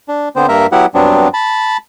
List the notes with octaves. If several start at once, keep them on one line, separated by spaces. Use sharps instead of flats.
D4
D3 B3 C4 C5
G2 A#3 A#4 E5
F#3 B3 E4 G4 F#5
G2 F#3 B3 C4 D4
A5 B5